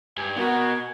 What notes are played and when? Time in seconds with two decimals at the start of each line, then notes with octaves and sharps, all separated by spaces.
0.18 G2 G#5
0.37 B2 F#4 A#4 F#5